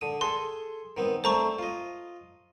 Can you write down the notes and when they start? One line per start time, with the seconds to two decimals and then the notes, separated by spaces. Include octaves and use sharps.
0.01 D3 D#6
0.21 G#4 A4 C6
0.97 D#3 B3 C4
1.24 A3 C4 D4 C5 A#5 C#6
1.59 F4 D#5